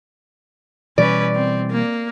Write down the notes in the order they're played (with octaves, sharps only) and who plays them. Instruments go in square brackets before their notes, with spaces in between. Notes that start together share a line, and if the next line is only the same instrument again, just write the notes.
[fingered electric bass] B2 E3 G3 [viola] C#4 B4 [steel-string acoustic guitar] D5
[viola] C4
A#3